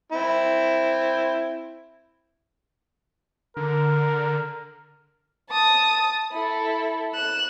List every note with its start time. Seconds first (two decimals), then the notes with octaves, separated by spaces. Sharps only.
0.12 C4 E4
3.57 D3 A#4
5.50 A5 D#6
6.32 E4 A4
7.15 F#6 E7